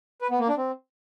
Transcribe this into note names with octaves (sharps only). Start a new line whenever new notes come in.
B4
B3
A#3
D4
C4